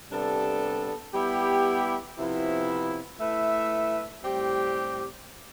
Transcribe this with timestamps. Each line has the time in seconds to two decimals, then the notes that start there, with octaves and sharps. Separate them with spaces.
0.11 C3 G3 B3 D4 A4
1.14 G3 B3 E4 G4
2.17 C3 F3 B3 E4
3.20 A3 E4 B4 E5
4.23 A2 G3 C4 G4